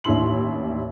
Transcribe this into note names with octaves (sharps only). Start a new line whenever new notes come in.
A1 D#2 D4 E4 C6 F#7